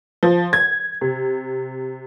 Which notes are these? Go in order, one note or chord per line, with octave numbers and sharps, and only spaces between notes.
F3
G#6
C3